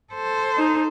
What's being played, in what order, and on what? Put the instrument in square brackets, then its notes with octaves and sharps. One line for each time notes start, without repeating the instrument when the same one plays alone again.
[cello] A4 C5
[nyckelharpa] D#4